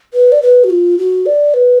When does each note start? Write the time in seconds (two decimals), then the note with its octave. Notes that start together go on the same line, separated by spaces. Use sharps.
0.13 B4
0.32 D5
0.42 B4
0.64 F#4
0.70 F4
0.98 F#4
1.26 D5
1.54 B4